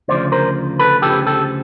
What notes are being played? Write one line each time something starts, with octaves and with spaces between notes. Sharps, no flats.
D2 C#3 F3 C5 D5
A#4 C5
A4 B4
D2 C#3 F3 G4 A4
G4 A4